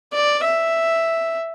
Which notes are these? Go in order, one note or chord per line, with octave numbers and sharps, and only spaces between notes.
D5
E5